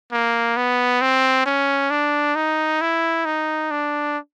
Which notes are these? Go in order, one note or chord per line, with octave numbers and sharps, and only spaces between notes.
A#3
B3
C4
C#4
D4
D#4
E4
D#4
D4